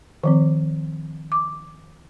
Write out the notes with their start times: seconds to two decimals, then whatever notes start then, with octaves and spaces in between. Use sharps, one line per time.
0.23 D#3 F3 C4
1.32 D6